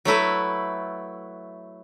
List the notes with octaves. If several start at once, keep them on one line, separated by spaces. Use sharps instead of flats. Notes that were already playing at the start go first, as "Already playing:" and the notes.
F#3 A3 E4 B4